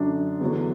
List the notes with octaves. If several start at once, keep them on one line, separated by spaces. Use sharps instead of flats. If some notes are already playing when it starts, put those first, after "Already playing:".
Already playing: F#2 D3 F#3 D4
E2 D3 F#3